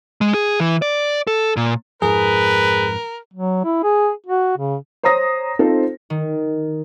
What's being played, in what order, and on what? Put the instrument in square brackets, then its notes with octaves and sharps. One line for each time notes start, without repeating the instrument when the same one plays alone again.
[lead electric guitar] G#3
G#4
E3
D5
A4
A#2
[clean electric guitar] F2 G#2 [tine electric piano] G#4 [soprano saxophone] A#4 [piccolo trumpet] B4
[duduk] F#3
E4
G#4
F#4
C#3
[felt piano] C5 C#5 A#5 D#6 A#6
C4 D#4 F4 A4 C5
[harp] D#3